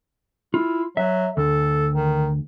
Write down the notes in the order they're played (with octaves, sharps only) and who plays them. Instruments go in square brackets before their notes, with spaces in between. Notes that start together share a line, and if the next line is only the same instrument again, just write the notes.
[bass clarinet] E4 [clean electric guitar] F4
[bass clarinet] F#3 [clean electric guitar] E5
[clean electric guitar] D2 [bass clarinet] A4
[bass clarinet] D#3